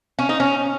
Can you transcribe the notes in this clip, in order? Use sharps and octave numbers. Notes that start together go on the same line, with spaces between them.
C#4
D#4
C#4